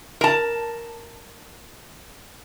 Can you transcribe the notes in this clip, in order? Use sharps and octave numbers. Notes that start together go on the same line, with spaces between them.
A#4 A5